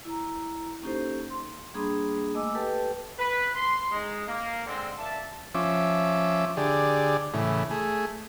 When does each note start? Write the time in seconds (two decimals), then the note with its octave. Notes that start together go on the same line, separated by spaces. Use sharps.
0.05 E4 A#5
0.83 A#3 C#4 D#4 G4 A4 C5
1.30 C6
1.74 G3 A#3 D4 G#4 B5 D#6
2.34 A3 A#3 D#5 G#5 D6 E6
2.55 G4 A4 B4 G5 A5
3.19 B4
3.54 C6
3.92 G#3 D#4
4.27 A#3
4.67 D3 G#3 C4
4.98 A#3 D5 E5 A5
5.55 F3 C#4 E5 D6
6.57 D3 G4 G#4 D5
7.34 A2 C#3 E3
7.71 A3 G#4